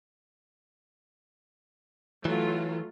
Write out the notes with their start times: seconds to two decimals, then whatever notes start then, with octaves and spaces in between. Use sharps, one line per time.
2.25 E3 F#3 A3 F4